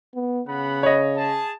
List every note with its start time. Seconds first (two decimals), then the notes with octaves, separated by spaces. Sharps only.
0.15 B3
0.47 C#3 B3 F#5 B5
0.83 C#5 D#5
1.17 G#4 A5